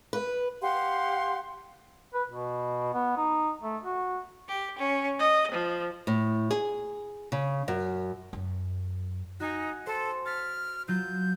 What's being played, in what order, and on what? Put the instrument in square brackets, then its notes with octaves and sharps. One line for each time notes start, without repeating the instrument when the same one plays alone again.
[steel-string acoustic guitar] B4
[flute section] G4 F5 F#5 C6
[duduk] B4
B2
B3
D#4
A3
F#4
[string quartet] G4
C#4
D#5
F3
[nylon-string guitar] A2
G#4
C#3
F#2
[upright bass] F#2
[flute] D#4 [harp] F#4 G#5
[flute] A4 [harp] C5
[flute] F6 [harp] A6 B6
[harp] F#3 F4 [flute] G6